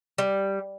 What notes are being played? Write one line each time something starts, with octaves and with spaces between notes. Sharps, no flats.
G3